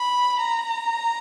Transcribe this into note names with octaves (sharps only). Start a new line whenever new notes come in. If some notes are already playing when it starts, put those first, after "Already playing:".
Already playing: B5
A#5